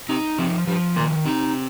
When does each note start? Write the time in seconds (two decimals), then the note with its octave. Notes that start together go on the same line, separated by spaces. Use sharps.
0.09 C3 D#4
0.38 C3 F3
0.67 G2 F3
0.96 A#2 D#3
1.25 C3 D#4